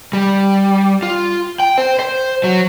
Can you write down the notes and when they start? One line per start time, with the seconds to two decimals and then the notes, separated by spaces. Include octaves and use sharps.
0.13 G3
1.03 F4
1.60 G5
1.78 C5
1.99 C5
2.44 F#3